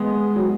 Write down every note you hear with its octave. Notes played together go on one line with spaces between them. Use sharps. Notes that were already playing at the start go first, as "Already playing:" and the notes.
Already playing: G#3 B3
F#3